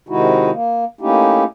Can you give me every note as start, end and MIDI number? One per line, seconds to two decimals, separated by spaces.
0.09 0.51 48
0.09 0.51 51
0.09 0.51 56
0.09 0.51 63
0.09 0.51 64
0.09 0.51 66
0.52 0.85 58
1.01 1.44 57
1.01 1.44 58
1.01 1.44 61
1.01 1.44 63
1.01 1.44 64
1.01 1.44 67